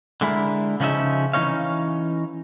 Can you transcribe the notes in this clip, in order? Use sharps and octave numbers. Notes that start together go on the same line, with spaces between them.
D3 G#3 E4 A#4
C#3 F3 C#4 D#4 E5
E3 G#3 C#4 D#4 C#5 F5